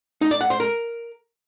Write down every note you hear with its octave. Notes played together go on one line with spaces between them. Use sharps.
D#4
D5
F#5
C5
A#4